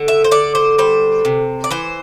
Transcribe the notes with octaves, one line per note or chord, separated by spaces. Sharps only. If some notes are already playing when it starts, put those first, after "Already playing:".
Already playing: D3
E5
C5
D3 D5
C5
G3 C5
C3
D5
E3 C5